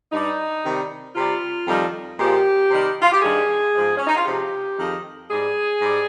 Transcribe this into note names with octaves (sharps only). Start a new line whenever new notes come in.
G2 G3 D#4
C3 D#3 G3
C3 G3 F4
F2 D#3 G3
A#2 F3 G#3 G4
C3 D#3 G3
F4
G4
G2 D#3 G3 G#4
G#2 F3 G#3
C#4
D#4
F4
C3 F3 G#3 G4
F2 D#3 G#3
G#2 G3 G#4
G#2 G3